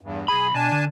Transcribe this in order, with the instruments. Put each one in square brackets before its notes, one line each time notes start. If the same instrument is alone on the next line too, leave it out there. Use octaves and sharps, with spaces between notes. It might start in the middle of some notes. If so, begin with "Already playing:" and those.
[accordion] E2 G2
[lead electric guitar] B1 B5 [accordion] G#4 G#5
[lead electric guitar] B2 [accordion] D4 G#5 A5
[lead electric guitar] D3